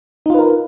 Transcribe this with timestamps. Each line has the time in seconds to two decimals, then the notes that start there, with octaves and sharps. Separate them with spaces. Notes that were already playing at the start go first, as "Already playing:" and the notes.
0.26 D#4
0.30 F4
0.34 B4
0.39 A#4